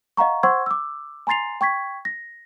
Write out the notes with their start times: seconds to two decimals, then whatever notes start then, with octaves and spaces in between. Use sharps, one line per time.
0.17 D#5 F5 F#5 A#5 C#6
0.43 C5 F#5 C6 C#6 E6 G#6
0.66 D6 E6
1.27 G#5 A#5 C6 A6 C7 F7
1.61 G5 C#6 G#6 B6
2.05 A#6